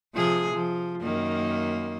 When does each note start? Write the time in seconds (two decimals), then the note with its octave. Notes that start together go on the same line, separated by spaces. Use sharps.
0.15 C3 F3 G#4
0.53 F3
1.02 F#2 D#3 A#3